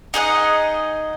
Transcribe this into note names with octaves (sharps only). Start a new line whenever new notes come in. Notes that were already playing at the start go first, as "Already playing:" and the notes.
D#4 G#4 D#5 F#5